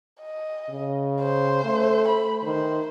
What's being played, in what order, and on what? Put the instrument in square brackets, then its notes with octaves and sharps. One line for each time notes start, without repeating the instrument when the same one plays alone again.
[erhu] D#5
[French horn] C#3
[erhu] C5
[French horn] A3
[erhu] B5
[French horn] D#3 [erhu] C5